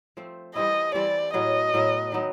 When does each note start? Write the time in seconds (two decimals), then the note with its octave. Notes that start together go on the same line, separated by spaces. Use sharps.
0.17 F3 A3 C4
0.55 E3 G3 C4 E4 D#5
0.94 E3 G3 C4 E4 D5
1.34 A2 F#3 B3 D#5
1.74 A2 F#3 B3
2.12 D#3 F#3 B3 D#4